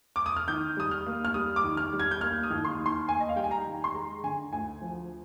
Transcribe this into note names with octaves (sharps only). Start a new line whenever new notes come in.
D6
D#6
F6
D#3 G6
G3 D#6
F6
A#3
F6
G3 D#6
D6
D#3
F6
G3
G#6
G6
A#3 F6
D#6
D#2
C6
D#3
C6
A#3 G#5
D#5
F5
G3 G5
G#5
A#5
D#3
C6
G#3 A#5
D3 G#5
D2 G#5
F3